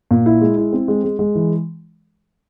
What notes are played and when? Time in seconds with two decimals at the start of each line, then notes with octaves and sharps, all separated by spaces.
0.11 A#2
0.26 E4
0.41 G#3
0.57 E4
0.73 C4
0.88 G#3
1.04 G#3
1.19 G#3
1.35 E3